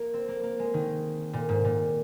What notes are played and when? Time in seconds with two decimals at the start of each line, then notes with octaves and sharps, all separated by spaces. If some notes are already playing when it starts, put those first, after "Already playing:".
Already playing: A#3
0.14 C4
0.28 A#3
0.43 A#3
0.59 G#3
0.74 D#3
1.33 A#2
1.49 G#2
1.64 A#2